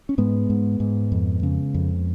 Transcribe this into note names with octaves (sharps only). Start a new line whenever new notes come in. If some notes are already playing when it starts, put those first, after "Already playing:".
C#4
G#2 G#3 B3
G#2
G#2
F2
C#3
F2